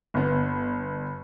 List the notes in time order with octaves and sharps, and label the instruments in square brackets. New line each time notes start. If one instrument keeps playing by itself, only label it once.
[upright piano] G1 B3